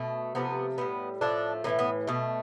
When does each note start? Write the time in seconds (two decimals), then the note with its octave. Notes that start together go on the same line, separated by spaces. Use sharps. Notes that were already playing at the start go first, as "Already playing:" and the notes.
Already playing: B2 A3
0.35 C3 F3 A3 B3
0.78 A2 G3 B3
1.21 A2 F3 A3 D4
1.64 A2 E3 A3 B3
1.79 B3
2.07 B2 A3